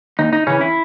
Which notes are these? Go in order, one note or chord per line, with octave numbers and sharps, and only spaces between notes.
D#2 D#4
D#4
C#3 E3 C#4
E4